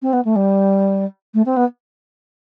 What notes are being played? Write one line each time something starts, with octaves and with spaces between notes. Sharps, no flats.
C4
B3
A3
G3
A3
C4
B3